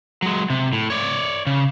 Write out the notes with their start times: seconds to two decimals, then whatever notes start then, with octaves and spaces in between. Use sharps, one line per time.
0.22 F#3 G#3
0.50 C3
0.73 A2
0.90 C#5 D5
1.47 C#3